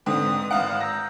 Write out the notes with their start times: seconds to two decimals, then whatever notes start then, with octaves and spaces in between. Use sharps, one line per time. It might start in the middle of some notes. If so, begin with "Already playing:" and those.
0.06 G#2 D3 C4 B4 D#6
0.51 G#1 F5 F#5
0.80 A#5 E6 G6 A#6